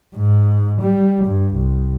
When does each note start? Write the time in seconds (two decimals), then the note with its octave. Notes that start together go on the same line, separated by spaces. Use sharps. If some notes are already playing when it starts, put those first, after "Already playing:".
0.16 G#2
0.81 G3
1.25 G2
1.55 C2